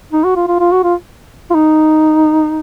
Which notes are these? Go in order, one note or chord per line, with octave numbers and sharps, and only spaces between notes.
D#4
F#4
F4
F4
F4
F#4
F4
F4
D#4